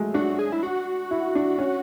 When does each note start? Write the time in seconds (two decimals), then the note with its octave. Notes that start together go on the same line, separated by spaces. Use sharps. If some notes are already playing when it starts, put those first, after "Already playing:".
Already playing: F#3 G#3 A3
0.14 D4 F#4
0.39 G#4
0.52 E4
0.63 F#4
1.11 E4
1.35 D4
1.58 C#4